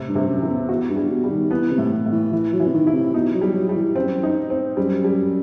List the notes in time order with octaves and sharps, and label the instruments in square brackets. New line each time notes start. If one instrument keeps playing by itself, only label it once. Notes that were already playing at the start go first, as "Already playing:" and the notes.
Already playing: [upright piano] A2 C3
[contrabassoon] G2
[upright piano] C3
[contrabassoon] F#2
[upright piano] E3
[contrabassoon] E2
[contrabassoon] E2 [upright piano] F#4
[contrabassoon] G2
[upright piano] G3
[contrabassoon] B2
[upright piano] G3
[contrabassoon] D#3
[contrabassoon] E3 [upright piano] B3
[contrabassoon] C3
[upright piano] A2
A2
[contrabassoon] E3
[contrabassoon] E3 [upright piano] E4
[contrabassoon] F#3
[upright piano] E3
[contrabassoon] C3
D#3
[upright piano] E4
[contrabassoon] C3
[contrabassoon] B2 [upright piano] D#4
[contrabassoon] F#3
[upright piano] G3
[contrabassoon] F#3
[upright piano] G3
[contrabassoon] E3
[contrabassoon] F#2 [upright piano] C4
[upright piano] D#4
C4
[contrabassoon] F#2 [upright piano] G3
[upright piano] G3